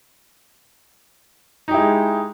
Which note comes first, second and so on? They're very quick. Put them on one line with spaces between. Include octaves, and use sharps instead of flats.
D#4 G4 E4 G#3